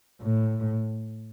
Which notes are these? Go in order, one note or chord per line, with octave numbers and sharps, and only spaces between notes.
A2